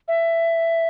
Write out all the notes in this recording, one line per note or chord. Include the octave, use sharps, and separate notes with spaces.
E5